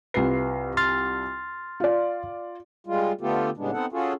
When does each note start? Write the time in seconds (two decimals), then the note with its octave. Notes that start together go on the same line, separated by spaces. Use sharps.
0.14 C2 F4 B4 C7
0.77 C6 F6 A6
1.80 F4 D5
2.87 G3 G#3 F4
3.21 D3 A3 B3 F4 G4 A4
3.57 A2 C#3 G3 G#3 B3 D4
3.72 B3 C4 D#4 A4 F#5
3.92 C#4 F4 F#4 G#4 A4